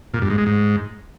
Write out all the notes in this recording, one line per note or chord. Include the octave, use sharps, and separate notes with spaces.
A#2
G2
G#2
G#3
G#2